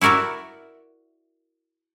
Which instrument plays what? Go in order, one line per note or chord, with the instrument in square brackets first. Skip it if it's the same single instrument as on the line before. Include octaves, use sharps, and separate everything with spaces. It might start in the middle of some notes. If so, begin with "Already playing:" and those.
[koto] E4 F#4 A#4 D5 E5